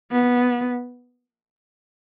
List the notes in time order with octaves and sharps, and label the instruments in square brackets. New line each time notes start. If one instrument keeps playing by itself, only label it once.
[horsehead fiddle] B3